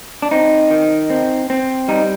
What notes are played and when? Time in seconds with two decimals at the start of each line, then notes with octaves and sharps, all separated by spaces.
0.22 D4
0.31 C4 D#4
0.71 D#3
1.10 C4
1.50 C4
1.88 G3 D#4